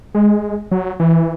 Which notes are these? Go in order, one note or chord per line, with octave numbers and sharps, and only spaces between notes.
G#3
F#3
E3